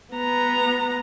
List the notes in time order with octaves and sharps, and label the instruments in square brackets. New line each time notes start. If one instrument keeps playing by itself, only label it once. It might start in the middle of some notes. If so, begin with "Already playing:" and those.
[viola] B3 A#5